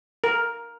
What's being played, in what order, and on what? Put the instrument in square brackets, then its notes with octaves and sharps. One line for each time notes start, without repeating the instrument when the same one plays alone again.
[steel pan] A#4